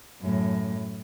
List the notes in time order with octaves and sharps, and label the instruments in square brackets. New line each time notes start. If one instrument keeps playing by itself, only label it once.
[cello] F#2 A2